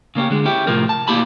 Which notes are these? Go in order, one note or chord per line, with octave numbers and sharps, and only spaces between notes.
C#3 A#3 C#4 G4
D3 G#3
C#4 E4 G4
A2 C3 F3 A#4
A5
B1 A#3 E4 G4 B5